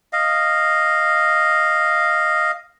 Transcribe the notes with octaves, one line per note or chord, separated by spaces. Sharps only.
D#5 F5